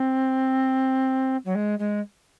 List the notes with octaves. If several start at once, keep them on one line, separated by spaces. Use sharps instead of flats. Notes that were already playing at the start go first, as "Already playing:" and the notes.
Already playing: C4
F#3
G#3
G#3